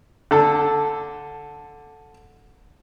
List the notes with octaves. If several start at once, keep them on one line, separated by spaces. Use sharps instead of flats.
D3 A4